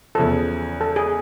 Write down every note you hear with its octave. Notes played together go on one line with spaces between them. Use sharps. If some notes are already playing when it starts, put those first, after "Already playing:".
E2 C#3 F3 A4
A4
G#4